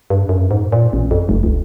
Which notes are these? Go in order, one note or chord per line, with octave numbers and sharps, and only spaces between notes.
G2
F#2
G#2
A#2
A1
F2
F1
C#2